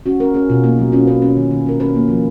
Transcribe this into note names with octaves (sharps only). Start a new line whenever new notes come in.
C#4 F#4
C#4 A#4
C#4 G#4
B2 F4
A#3 D#4
F#3
C#4 F4
C#4 B4
C#4
D#3
D#3
C#4 A#4
C#4 B4
A#3
F3